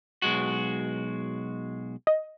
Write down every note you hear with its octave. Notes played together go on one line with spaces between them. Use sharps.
B1 G#3 F#4
D#5